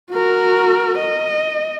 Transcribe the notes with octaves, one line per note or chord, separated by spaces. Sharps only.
F#4 A#4
D#5